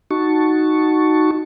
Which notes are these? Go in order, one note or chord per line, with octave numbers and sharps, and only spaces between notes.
D#4 F#4 A5 C#6